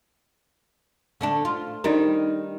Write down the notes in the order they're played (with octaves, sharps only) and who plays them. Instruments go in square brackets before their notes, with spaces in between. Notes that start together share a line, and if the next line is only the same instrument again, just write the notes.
[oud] D3 A3 D4
F4
[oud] D#3 G3 [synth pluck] D4 D#4 A#4